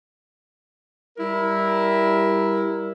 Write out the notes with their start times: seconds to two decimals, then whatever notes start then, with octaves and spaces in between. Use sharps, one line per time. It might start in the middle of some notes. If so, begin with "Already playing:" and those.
1.18 G3 E4 A#4